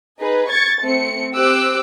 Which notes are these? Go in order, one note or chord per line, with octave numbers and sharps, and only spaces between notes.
D#4 G#4 B4
C#6 G#6 A6 C#7
A3 C4 C#7
C4 G4 D6 E6 F#6